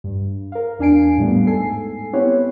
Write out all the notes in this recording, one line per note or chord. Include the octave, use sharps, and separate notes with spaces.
G2
A#4 F5
E2 D4 F5 G#5 C7 D7
A2 G3 A3 B3
G#2 A4 G#5 C7
B3 C4 E4 G4 B4 C#5